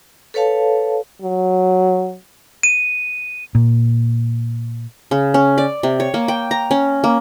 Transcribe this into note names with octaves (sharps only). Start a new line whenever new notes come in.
A4 B4 C#5 F5 A5
F#3
D#7
A#2
C#3
C#4
D5
C3
C#5
A#3
G5
A#5
C#4
A#3